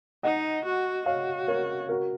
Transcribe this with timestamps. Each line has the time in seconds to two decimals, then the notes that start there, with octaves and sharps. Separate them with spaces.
0.23 D#4 D#5 F#5
0.65 F#4
1.06 F#4 C#5 F5
1.48 A#4 C#5
1.89 F#4 A#4